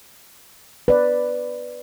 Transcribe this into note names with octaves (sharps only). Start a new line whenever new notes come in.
B4 D5